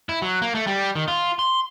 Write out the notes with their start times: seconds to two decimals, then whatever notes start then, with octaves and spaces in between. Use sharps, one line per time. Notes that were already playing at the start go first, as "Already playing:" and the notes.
0.09 E4
0.22 F#3
0.42 A#3
0.55 A3
0.67 G3
0.95 D#3
1.08 F4
1.39 C6